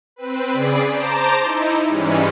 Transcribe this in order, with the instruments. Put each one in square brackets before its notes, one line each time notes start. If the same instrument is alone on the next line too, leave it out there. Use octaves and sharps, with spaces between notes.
[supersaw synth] C4 B4
C#3 G#4 D5 B5 C7 D7
C5 A5 A#5 D6 G6
D#4 E4
G#2 E3 G3 G#3 C#4